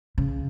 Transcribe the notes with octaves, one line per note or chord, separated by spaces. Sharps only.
C#3